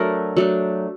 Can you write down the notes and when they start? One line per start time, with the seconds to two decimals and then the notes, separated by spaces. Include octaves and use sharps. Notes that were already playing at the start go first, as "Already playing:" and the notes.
Already playing: F#3 A3 D4 A#4
0.37 F#3 A3 D4